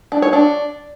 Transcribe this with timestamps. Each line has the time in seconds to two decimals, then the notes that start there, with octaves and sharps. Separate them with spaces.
0.12 D4
0.22 C#5
0.33 D4